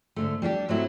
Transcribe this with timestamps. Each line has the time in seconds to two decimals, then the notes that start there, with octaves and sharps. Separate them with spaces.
0.16 G#2 D3 A3
0.42 G3 D4 F#4 G4
0.68 G#2 F#3 A3 C4 E4 F#4